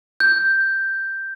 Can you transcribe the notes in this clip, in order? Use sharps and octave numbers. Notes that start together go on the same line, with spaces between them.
G6